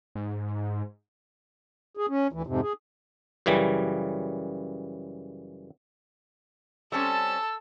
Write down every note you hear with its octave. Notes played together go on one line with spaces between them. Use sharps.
G#2
G#4
C#4
D2 E3
F2 G#2 C3
G#4
F#2 C#3 E3 G3
G3 C4 C#4 A4 A5 E6